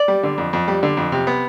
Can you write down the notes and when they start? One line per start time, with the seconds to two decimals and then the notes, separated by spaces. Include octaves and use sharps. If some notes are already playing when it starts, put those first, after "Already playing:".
Already playing: D5
0.08 G3
0.23 D3
0.38 F2
0.53 F2
0.68 G3
0.83 D3
0.97 F2
1.12 C3
1.27 B3